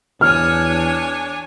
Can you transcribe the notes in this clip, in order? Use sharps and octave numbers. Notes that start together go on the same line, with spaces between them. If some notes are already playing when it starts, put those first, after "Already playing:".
E2 D4 C#5 G#5 F6